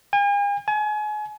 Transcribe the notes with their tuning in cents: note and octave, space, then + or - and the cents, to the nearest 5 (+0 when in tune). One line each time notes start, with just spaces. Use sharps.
G#5 -45
G#5 +30